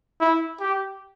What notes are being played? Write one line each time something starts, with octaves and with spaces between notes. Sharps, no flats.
E4
G4